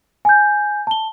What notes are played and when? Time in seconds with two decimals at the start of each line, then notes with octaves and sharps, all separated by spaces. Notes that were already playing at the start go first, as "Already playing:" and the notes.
0.25 G#5 G6
0.87 A5 G7